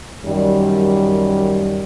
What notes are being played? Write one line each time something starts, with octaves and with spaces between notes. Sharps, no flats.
F#2 D#3 G3